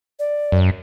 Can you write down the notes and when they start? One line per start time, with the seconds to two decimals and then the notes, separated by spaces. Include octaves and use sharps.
0.19 D5
0.52 F#2